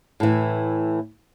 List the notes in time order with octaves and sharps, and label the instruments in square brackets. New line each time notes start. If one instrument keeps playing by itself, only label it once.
[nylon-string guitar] A2 E3